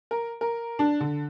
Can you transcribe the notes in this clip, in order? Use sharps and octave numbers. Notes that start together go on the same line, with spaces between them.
A#4
A#4
D4
D3